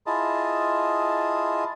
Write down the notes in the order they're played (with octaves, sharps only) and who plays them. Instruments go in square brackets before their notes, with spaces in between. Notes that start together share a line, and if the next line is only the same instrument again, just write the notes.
[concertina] E4 F4 G#4 D#5 A5